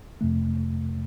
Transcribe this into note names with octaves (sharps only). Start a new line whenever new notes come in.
F2 C3 A3